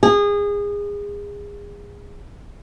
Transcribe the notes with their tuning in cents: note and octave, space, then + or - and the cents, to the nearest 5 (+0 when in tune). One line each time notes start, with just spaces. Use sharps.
G#4 -25